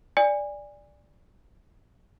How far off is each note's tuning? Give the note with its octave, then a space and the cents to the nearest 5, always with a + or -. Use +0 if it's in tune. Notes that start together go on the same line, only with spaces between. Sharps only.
D5 +0 G#5 -25